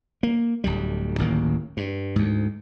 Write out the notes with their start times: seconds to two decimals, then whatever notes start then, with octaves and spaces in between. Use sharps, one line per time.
0.23 A#3
0.64 D1 D2 G3
1.18 D1 A1 D#3 A#3
1.77 G2
2.16 D2 G#2